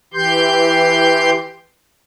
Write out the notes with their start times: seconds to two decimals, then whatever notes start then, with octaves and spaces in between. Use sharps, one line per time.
0.14 E3 G4 C6 G6